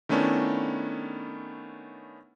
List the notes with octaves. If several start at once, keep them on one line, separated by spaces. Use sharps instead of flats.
D#3 A3 B3 C#4 D4 E4